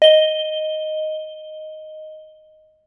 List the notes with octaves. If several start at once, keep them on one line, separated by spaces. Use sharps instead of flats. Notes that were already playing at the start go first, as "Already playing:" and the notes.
D#5 G7